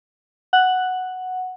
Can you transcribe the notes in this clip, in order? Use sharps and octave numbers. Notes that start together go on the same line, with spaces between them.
F#5